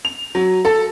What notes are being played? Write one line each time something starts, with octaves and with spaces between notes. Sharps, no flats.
F7
F#3
A4